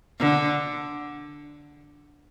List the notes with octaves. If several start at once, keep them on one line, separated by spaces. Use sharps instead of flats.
D3